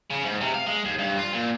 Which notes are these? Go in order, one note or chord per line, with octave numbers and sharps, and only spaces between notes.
C#3
G#2
C3
F5
G#3
D#2
G2
F4
A#2